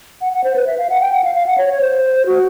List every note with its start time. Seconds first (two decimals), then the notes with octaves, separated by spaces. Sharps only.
0.21 F#5
0.32 F#5
0.44 C5
0.56 B4
0.67 E5
0.78 F5
0.90 F#5
1.01 G5
1.12 F#5
1.24 F5
1.35 F5
1.47 F#5
1.58 C#5
1.70 C#5
1.81 C5
2.26 F#4